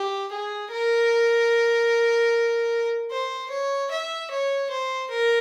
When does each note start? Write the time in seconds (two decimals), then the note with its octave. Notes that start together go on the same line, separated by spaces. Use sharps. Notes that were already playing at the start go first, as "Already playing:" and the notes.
Already playing: G4
0.32 G#4
0.71 A#4
3.11 C5
3.51 C#5
3.91 E5
4.31 C#5
4.71 C5
5.10 A#4